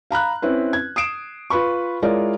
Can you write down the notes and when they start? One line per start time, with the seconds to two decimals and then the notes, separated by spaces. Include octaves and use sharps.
0.11 F5 A#5 B5 F#6
0.42 C4 C#4 E4 B4
0.73 G#6
0.96 D#6 C7 D7 E7
1.50 F4 B4 B5 C#6
2.02 G#3 E4 F4 A#4 C#5 D5